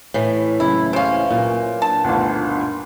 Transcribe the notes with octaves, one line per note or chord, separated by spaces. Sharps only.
A2 E3
C#2 C#3 F#3 E4
C3 C#4 C5 F5
A#2 F#3 F4 A#4
D4 A5
G1 D2 G2 B2 D#3